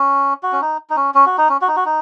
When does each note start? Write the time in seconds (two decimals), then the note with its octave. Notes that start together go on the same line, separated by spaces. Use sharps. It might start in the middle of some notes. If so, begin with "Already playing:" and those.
Already playing: C#4
0.43 F#4
0.52 C#4
0.61 D#4
0.90 D#4
0.96 C#4
1.14 C#4
1.26 F#4
1.38 D#4
1.49 C#4
1.61 F#4
1.68 D#4
1.76 F#4
1.85 D#4